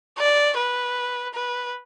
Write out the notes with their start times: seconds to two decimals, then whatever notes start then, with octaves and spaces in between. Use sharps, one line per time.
0.18 D5
0.57 B4
1.34 B4